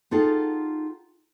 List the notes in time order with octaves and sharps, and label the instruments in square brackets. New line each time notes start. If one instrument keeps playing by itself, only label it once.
[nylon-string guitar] D#4 F4 G#4 A4 F#5 G5